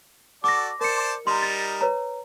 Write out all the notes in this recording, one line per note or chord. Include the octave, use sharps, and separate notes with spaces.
F#4 A4 D5 D6 A#6
A#4 C5 D5 A5 C#7
G3 D#4 A#4 A#5 C6
A6
B4 C#5 A#5